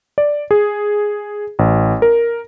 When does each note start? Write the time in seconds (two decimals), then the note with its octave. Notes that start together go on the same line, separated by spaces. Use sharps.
0.18 D5
0.51 G#4
1.59 A1
2.02 A#4